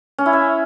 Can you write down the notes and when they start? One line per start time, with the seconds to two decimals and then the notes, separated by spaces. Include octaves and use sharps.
0.18 C#4
0.26 E4
0.33 E5